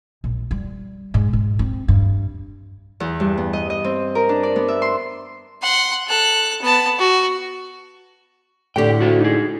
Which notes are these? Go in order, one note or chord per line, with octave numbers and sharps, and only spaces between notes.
A#1
G3
G#2
G#2
C4
G2
E2
G2
B3
D#5
D#5
C4
A#4
D4
D5
B3
E5
C6
F#5 C6
A4 F#6
B3 A5
F#4
A2 D3 G4 G5
F#4 C5
D#4 G#4